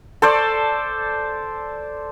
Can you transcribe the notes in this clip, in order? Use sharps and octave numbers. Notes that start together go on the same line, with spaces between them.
A4 C5 D5